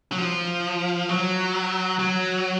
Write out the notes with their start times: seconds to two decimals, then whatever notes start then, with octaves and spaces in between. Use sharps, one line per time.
0.12 F#3
0.18 F3
1.09 F#3
1.99 F#3